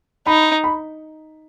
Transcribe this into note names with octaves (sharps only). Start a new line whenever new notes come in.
D#4 B5
B5